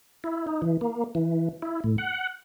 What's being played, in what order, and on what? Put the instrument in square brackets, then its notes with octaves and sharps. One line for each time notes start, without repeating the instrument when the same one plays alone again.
[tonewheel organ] E4
D#4
E3
A#3
E3
E4
A2
F#5